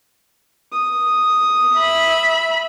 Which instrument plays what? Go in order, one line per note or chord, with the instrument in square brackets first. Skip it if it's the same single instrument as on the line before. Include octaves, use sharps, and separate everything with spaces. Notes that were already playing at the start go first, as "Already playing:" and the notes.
[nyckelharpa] D#6
[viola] E5 B5